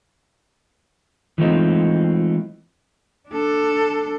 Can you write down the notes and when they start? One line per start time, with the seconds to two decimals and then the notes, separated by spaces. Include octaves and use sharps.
1.38 E3 F3 G#3 A3 C4 D#4
3.28 D4 A4